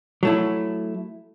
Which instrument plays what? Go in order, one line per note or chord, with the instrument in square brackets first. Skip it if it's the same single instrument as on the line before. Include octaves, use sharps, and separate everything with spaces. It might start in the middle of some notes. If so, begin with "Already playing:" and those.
[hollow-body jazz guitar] F#3 A3 E4